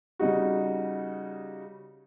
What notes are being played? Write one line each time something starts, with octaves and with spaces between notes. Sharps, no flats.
C#3 G3 D#4 F#4